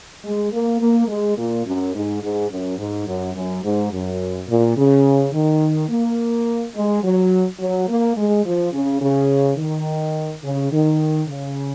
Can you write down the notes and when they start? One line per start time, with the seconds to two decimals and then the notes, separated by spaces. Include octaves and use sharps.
0.24 G#3
0.52 A#3
0.80 A#3
1.08 G#3
1.37 A#2
1.65 F#2
1.94 G#2
2.22 G#2
2.50 F#2
2.78 G#2
3.07 F#2
3.35 F#2
3.63 G#2
3.92 F#2
4.48 A#2
4.76 C#3
5.33 D#3
5.89 A#3
6.74 G#3
7.03 F#3
7.59 F#3
7.88 A#3
8.16 G#3
8.44 F3
8.72 C#3
9.01 C#3
9.57 D#3
10.42 C#3
10.71 D#3
11.28 C#3